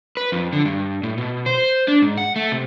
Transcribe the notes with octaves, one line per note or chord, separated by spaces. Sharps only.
B4
F2
D3
G2
A2
B2
C5
D4
G#2
F#5
A3
C3